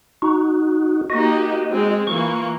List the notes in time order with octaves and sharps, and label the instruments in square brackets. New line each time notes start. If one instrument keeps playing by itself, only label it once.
[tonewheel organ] D#4 F#4
[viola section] A#3 D#4 G4 [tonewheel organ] F#4 D#5
[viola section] G#3 C4
[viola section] E3 A#3 F4 [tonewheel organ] C#6